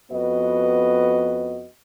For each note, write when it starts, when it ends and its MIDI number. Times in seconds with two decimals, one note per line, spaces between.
0.11 1.67 41
0.11 1.67 59
0.11 1.67 66
0.11 1.67 71
0.11 1.67 75